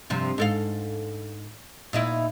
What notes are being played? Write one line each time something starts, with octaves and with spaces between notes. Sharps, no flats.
G2 C3 F3
G#2 A4 F5
A#2 D#4 E4